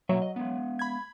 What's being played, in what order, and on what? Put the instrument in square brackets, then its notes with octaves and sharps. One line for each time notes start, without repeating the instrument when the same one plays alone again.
[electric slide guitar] B2 A#3 E5 [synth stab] F#3
[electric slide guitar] D#5
G#3 B3
[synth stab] B5 G#6